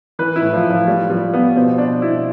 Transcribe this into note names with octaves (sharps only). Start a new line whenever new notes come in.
E3 B4
E4
A2
F3
A2
F3
A2 G3
F3 G3
F3 B3
B2 C4
B2 D4
B2 E4